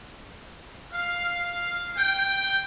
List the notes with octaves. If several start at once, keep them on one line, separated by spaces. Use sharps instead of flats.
F5
G5